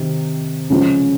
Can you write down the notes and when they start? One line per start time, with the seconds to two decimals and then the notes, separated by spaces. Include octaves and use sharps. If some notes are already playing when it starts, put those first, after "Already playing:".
Already playing: C3 D#3
0.70 C#3 F3 G#3